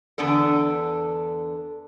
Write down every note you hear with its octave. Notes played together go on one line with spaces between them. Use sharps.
E2 D3 B3 D4 A4